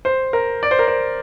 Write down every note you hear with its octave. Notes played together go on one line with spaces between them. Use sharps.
C5
A#4
D5
C5
A#4
C5